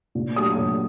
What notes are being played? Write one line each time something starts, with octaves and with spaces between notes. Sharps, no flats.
A#2
F#3 A3 D4 D#6
A#2